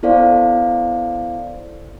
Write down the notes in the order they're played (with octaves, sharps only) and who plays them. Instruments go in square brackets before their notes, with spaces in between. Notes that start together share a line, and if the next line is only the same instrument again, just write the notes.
[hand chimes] B3 E4 A4 C5 D5 F5